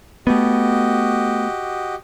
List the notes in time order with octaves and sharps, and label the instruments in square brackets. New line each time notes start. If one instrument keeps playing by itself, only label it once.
[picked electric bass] A3 B3 [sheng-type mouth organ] F#4 G4 D#5